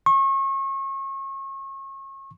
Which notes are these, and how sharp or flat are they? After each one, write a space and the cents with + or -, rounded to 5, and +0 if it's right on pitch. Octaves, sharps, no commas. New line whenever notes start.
C#6 -35